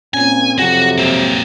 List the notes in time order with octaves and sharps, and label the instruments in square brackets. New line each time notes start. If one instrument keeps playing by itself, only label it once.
[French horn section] A#2 C4 C#4 [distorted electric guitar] G#5
[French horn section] F2 C3 F#3 [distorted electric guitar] F#4
[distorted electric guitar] A#3 C4